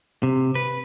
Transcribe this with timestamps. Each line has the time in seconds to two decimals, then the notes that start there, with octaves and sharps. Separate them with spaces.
0.23 C3
0.55 B4